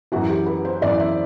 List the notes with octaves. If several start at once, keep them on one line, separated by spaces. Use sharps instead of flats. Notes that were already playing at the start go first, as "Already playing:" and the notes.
F#2 E3 F#4
G4
B4
C5
F#2 E3 D5
E5